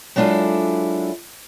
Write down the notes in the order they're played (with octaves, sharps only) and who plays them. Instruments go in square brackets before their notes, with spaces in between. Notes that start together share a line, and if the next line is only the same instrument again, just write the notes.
[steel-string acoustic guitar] F#3 G#3 D4 E4 F4 A4